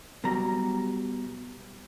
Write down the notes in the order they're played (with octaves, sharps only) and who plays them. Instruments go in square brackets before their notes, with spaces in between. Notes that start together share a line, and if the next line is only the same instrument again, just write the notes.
[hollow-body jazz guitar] B2 F#3 G3 A#5